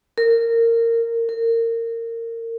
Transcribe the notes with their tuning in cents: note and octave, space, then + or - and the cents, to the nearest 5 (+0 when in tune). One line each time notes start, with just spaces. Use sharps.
A#4 -20
A#4 -25